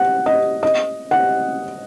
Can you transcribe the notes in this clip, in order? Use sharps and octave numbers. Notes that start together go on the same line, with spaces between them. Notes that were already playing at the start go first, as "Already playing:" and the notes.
Already playing: F#5
D#5
D#5
F#5